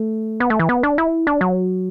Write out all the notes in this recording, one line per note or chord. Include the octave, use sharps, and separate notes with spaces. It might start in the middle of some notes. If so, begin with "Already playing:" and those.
Already playing: A3
B3
A3
E3
B3
D4
E4
D4
F#3